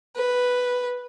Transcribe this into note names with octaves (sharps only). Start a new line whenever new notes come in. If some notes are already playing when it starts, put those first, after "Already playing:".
B4